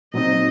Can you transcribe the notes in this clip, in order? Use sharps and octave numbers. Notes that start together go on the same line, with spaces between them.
A#2 F#3 C4 D#4 D#5